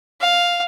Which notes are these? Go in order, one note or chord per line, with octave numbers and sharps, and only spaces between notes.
F5